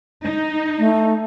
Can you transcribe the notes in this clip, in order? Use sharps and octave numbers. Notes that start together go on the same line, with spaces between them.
D#4
A3